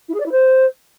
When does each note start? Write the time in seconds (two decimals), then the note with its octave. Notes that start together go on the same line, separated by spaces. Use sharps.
0.08 E4
0.14 G#4
0.20 D5
0.25 E4
0.31 C5